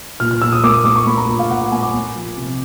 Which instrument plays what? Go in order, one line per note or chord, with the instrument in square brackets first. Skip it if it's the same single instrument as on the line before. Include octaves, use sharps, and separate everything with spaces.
[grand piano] A#2 F6
F6
A#2 E6
D#6
A#3 D6
D#6
A#3 D6
C#6
A#3 B5
A#5
A#2
F5
A#2 F#5
F#5
A#3 G#5
D6
A#3
F3
C3